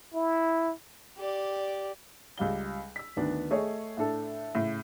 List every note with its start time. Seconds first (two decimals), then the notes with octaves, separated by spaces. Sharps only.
0.14 E4
1.18 G4 D5
2.38 C#2 G3 F5 G7
2.96 E6 B6
3.17 D2 D#3 B3 D4
3.51 A3 G#4 C#5 D#5
3.97 A2 D4 A4
4.55 A2 C#3